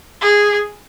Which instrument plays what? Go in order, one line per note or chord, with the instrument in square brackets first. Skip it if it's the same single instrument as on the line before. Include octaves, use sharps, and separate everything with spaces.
[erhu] G#4